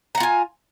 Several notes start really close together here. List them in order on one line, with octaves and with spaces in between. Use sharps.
A#5 F#5 F4 G#5